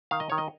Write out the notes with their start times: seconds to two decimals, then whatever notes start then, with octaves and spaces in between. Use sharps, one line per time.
0.11 D#3 F5
0.20 D#5
0.30 D#3 C#5
0.38 D#5